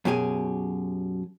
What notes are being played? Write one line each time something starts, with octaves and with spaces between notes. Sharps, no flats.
F#2 B2 G4 G#4 G#5